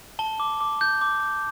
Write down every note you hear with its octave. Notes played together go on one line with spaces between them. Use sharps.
A5 G7
D6
D6
G6
D6